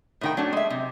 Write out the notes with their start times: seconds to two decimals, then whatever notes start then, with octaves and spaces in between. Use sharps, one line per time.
0.21 A2 D#3 G5
0.37 F#3 A3 D4
0.53 G#3 E5
0.70 C3